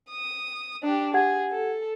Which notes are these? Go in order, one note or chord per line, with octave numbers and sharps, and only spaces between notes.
D#6
D4 G4
G4 G#4 F#5 G#6
A4